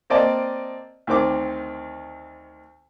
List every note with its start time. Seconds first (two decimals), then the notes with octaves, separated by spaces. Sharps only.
0.10 A#3 C4 D5 D#5 A5
1.07 D2 D#3 C4 D6